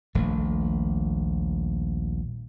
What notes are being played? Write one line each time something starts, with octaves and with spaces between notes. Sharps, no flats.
D#1 A#1 A3